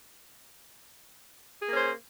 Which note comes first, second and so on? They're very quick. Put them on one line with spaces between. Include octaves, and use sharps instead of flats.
G#4 A#3 C#4 C5